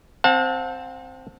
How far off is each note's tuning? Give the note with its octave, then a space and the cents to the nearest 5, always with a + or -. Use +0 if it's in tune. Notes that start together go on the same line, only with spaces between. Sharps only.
C4 +0 F#5 -45 A5 +0